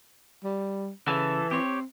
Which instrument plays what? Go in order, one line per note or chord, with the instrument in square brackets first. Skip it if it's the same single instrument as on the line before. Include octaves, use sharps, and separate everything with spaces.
[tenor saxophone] G3
[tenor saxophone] C#3 [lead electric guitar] E3 [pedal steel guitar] A4
[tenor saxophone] C4 [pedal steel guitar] G4 C#5